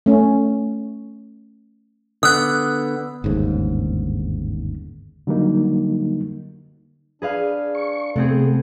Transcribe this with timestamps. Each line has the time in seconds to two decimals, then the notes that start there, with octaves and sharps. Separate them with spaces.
0.06 A3 C#4
2.23 D3 B3 D#6 F#6
3.24 G1 D#2 G#2 C#3
5.27 D3 F#3 G3 A#3 D#4
7.22 D4 G#4 B4 F5
7.75 C#6
8.16 C3 A3 B3 C4 G#4